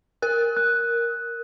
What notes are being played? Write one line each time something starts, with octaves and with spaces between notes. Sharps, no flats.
A#4 F#6
F#6